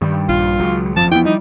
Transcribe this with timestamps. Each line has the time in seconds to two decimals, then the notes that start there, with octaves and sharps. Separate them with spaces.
0.01 G2 D#3 G3 G5
0.29 A#1 F4
0.60 C#2 F#3
0.97 F#1 F2 F3 A5
1.12 E2 B3 E4 G5
1.25 G3 D#4